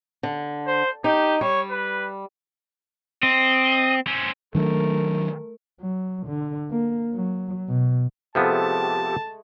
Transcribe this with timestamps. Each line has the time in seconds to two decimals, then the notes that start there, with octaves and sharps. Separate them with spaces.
0.23 D3
0.67 C5
1.04 D#4 G4
1.41 G3 C#5
1.70 B4
3.23 C4 D#5
4.07 C4 C#4
4.55 D#3 F#3 A3 D4 A#4
5.81 F#3
6.27 D3
6.71 A#3
7.14 F#3
7.69 B2
8.35 C3 F3 G#3 A3 B3 G4 A4 A5